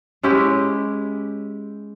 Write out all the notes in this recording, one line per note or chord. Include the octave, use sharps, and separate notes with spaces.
G#3 C#4 E4 G4